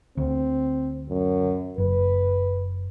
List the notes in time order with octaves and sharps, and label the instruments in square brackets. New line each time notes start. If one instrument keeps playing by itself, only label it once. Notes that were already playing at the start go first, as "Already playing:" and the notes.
[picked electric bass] D2 [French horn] C4
[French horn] F#2
[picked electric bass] F#1 [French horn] B4